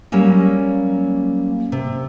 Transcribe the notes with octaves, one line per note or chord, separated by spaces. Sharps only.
F#3 G3 A#3 C#4
C3